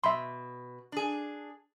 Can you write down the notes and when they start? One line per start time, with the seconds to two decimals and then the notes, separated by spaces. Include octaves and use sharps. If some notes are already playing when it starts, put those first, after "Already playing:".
0.04 B2 E5 B5 C6
0.92 D4 G#4